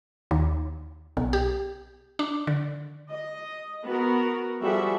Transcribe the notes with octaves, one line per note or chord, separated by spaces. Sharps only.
D#2
B1
G4
D4
D3
D#5
B3 F#4 A#4
F3 G3 F#4 G#4 A4 E5